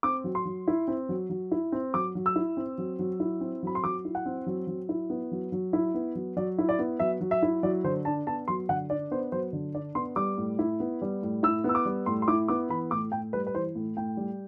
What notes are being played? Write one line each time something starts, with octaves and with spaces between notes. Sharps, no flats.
C4 D6
F#3
C6
F#3
E4
C4
F#3
F#3
E4
C4
F#3 D6
F#3
E6
E4
C4
F#3
F#3
E4
C4
F#3 B5
C6
F#3 D6
E4
F#5
C4
F#3
F#3
E4
B3
F#3
F#3
E4
B3
F#3
F#3 D5
E4
D5
B3
F#3 E5
F#3
E5
E4
F#3 D5
D3 C5
D4 A5
B3 A5
F#3 C6
D3 F#5
D4 D5
B3 C5
F#3 C5
D3
D4 D5
B3 C6
G3 D6
A2
E4
B3
G3
A2
E4 E6
B3 E6
D6
G3
A2 C6
C6
E4 D6
B3 D6
E3 B5
A2 D6
A2 G5
G3 B4
B4
E3 C5
A2
A2 G5
G3